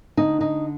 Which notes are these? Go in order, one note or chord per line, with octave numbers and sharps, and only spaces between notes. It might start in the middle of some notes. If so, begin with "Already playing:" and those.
D3 D#4
D3 D#4